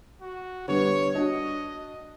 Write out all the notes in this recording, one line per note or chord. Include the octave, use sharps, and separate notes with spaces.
F#4
D3 G3 B3 C#5
D4 F#4 D#5